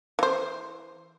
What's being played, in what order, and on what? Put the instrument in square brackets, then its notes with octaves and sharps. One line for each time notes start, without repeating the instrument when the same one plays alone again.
[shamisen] E3 C5